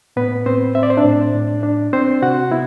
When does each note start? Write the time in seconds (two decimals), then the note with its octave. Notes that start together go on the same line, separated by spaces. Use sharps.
0.16 A2 B3 B4
0.46 A2 C4 C5
0.75 C4 E5
0.83 D5
0.90 C5
0.97 D4 D5
1.04 A2
1.35 A2
1.63 D4
1.93 C4 D4 C5
2.22 C3 F#4 F#5
2.52 B3 E4